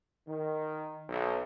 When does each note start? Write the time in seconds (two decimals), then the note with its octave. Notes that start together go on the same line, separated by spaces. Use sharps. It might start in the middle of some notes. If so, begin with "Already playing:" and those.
0.27 D#3
1.09 B1